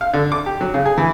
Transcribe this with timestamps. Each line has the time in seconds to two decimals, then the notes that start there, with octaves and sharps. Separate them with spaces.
0.01 F5
0.14 D3
0.32 D6
0.46 G4
0.61 F#3
0.74 C#3
0.86 G#4
0.98 E3